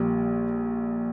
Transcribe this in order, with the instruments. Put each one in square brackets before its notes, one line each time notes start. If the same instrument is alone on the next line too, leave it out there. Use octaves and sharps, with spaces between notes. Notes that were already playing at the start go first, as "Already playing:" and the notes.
Already playing: [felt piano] A#1 A#2 G3